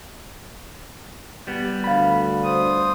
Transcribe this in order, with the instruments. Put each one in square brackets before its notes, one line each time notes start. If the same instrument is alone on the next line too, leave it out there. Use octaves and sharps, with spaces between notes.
[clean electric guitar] G3 B3
[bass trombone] D2 [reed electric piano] F5 B5
[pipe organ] C5 D#6